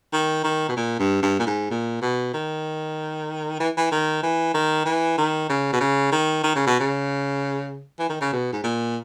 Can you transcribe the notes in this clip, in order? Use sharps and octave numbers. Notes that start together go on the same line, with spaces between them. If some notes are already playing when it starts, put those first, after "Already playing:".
D#3
D#3
B2
A#2
G2
G2
A#2
G#2
A#2
B2
D#3
E3
E3
D#3
E3
D#3
E3
D#3
C#3
B2
C#3
D#3
D#3
C#3
B2
C#3
E3
D#3
C#3
B2
G#2
A#2